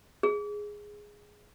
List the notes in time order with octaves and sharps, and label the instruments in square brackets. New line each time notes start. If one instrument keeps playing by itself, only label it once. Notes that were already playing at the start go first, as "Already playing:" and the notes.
[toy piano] G#4